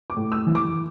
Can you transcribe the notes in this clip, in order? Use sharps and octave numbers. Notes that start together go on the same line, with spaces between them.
D6
A2
E6
E3
D6